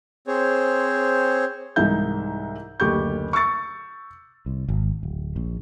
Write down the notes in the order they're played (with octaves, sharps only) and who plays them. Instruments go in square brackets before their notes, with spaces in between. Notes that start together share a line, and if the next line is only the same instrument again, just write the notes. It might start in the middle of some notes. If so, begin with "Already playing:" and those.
[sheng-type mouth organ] C4 G#4 C5 C#5
[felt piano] C2 G#2 E3 D#4 E5 G6
F#1 D2 G4 C#6 G6
C#6 E6 A6 C#7
[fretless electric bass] C2
G#1
D1
A#1